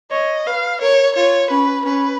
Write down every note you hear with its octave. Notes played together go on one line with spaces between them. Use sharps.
C#5 D#5
B4 F5
A#4 C#5
F4 C#5
C#4 B4
C#4 B4